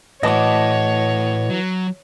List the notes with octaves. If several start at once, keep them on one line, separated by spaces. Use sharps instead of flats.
A2 E3 F#4 C#5 D#5 A5 D6
F#3